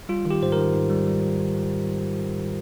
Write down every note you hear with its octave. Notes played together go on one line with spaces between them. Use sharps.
G3 F4
D#3
G4
G#2 C5
D#3 A#4
G#2
G3
G3